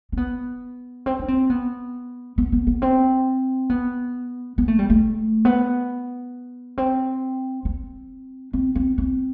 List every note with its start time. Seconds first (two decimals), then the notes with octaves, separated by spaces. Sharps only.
0.12 C4
0.17 B3
1.06 C4
1.19 D4
1.28 C4
1.50 B3
2.38 B3
2.52 B3
2.67 B3
2.82 C4
3.70 B3
4.58 B3
4.68 A3
4.79 G3
4.90 A3
5.45 B3
6.78 C4
7.65 C4
8.53 C4
8.75 C4
8.98 C4